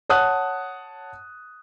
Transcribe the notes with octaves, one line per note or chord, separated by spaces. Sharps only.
C#5 F#5 A5 D#6 F#6